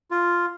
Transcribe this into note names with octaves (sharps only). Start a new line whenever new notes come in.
F4